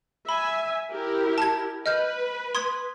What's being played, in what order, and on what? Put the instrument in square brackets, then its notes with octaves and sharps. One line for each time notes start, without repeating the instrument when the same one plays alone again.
[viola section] E5 G#5 [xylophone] B5
[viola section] E4 G4 A#4
[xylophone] A5 G#6
[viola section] B4 [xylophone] D#5 F6 G6
[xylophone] C6 D#6 G#6